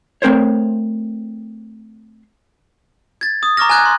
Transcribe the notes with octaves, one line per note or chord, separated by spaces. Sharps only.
A3 C4 A#4 C5 C#5
G#6 A6
D#6
A#5 C#6 D6 F6 A#6
G#5 A#5 F#6 G#6
G#5 C6